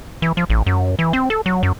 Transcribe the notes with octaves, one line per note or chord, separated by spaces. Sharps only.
E3
F3
A1
F#2
E3
C4
A4
F#3
F#2